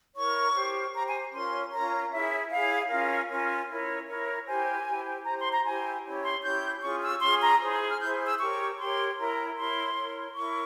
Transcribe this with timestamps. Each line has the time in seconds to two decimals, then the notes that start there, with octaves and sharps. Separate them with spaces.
0.15 E4 A#4 C#5 C#6
0.55 G4 C5
0.93 G4 C5 A#5
1.07 G#5
1.33 C#4 F4 A#4 C#5 C6
1.72 C#4 F4 A#4 C#5 A#5
2.11 E4 G#4 C#5 E5
2.51 E4 G#4 C#5 F5
2.90 C#4 F4 A#4 F5
3.29 C#4 F4 A#4
3.69 E4 A#4 C#5
4.08 E4 A#4 C#5
4.46 E4 G4 C5 G#5
4.86 E4 G4 C5
5.25 E4 G4 C5 A#5
5.39 C6
5.52 A#5
5.64 E4 G4 C5 G#5
6.04 C#4 E4 G4 C#5
6.23 C6
6.43 C#4 E4 G4 C#5 G6
6.82 C#4 F4 G#4 C#6
7.02 E6
7.21 C#4 F4 G#4 C6
7.42 A#5
7.61 E4 G#4 C5
7.89 F6
8.00 E4 G#4 C5 G6
8.27 E6
8.39 G4 A#4 C#5 C#6
8.79 G4 A#4 C#5 C6
9.18 E4 A#4 C#5 A#5
9.57 E4 A#4 C#5 C6
9.96 E4 A#4 C#5
10.35 E4 A#4 C#5 C#6